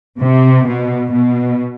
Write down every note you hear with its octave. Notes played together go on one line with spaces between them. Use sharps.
C3
B2
B2